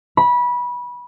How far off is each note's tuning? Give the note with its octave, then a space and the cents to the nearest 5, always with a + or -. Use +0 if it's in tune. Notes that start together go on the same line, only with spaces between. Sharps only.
B5 -20